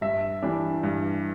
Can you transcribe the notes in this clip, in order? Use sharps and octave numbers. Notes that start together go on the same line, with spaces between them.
G2 E5
E3 G3 D4
G2